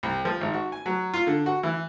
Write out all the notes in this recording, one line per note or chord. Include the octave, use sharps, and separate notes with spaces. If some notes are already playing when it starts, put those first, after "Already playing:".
C2
F3
G#1
F#4
G#5
F#3
F4
D3
F#4
E3